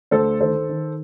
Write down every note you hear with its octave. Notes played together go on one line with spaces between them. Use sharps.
D2 A4 C5
D#3 A4 C5
D#3